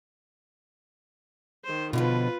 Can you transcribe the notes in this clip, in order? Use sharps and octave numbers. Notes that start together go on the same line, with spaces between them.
D#3 C5
B2 D3 F3 F4 B4